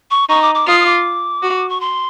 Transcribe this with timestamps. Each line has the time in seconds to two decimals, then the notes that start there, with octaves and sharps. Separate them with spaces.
0.11 C#6
0.29 D#4 C#6
0.42 D6
0.55 D6
0.67 F4 D#6
0.80 D#6
0.86 D6
1.43 F#4
1.69 C#6
1.81 C6